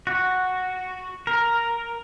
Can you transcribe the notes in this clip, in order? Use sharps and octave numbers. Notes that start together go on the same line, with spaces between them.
F#4
A#4